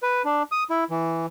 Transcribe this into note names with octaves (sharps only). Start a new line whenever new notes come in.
B4
D4
D#6
E4
E3